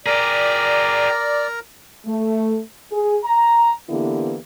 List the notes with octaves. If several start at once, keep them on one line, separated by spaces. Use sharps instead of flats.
G4 G#4 A#4 D5 A#5
A3
G#4
A#5
D3 E3 A#3 B3 E4 G4